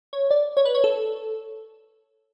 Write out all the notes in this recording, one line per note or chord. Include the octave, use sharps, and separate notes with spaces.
C#5
D5
C#5
B4
C#5
A4